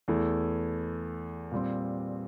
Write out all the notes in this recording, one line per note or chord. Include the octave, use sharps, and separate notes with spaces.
E2 E3 A3 E4
A#2 G3 C4